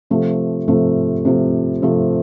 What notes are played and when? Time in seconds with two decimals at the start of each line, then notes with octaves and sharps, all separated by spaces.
0.10 C3 F3 A3
0.68 C3 F3 A3
1.25 C3 F3 A3
1.82 C3 F3 A3